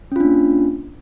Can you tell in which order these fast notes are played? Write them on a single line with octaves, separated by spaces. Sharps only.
C#4 F4 D4 A#3